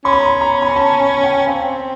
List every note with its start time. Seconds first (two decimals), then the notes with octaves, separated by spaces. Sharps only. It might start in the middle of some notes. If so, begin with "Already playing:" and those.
0.05 C#4 C6
0.13 B5
0.21 A#5
0.28 B5
0.41 A#5
0.62 B5
0.69 A#5
0.76 A5
1.00 G#5
1.24 G5
1.47 C4 F5